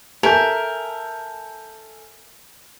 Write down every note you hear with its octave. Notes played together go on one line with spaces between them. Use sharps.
A4 A#4 E5 G#5 G6